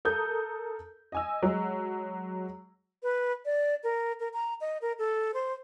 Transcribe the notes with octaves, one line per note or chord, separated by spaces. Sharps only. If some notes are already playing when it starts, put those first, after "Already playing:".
A4 A#4 D#6 G6
D#5 G#5 E6
F#3 G#3
B4
D5
A#4
A#4
A#5
D#5
A#4
A4
C5